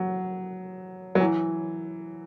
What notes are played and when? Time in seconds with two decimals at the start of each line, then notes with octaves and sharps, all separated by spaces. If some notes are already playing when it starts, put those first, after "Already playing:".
Already playing: F#3
1.15 F#3
1.20 E3